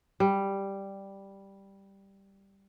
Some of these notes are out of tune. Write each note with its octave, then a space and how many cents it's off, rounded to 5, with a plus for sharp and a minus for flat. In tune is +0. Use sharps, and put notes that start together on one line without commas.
G3 +0